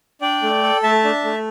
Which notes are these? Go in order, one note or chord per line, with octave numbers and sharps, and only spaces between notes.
D4 D5 G5
A3
A4
A3 E5 A5
D4
A3